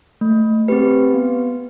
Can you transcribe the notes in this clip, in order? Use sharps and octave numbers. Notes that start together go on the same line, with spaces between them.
A3
C4 G4 B4
B3